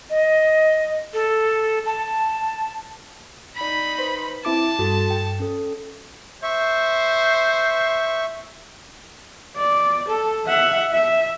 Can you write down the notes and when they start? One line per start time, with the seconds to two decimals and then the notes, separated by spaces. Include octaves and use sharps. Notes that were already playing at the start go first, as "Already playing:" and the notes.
0.10 D#5
1.14 A4
1.86 A5
3.56 D#4 D5 B5 B6
3.99 B4 C5
4.45 C4 E4 A5 D6
4.79 G2 F#4 A4
5.10 G5
5.40 C#4 A4
6.43 C5 E5 C#6
9.56 D5
10.08 A4
10.47 E5 F#5
10.93 E5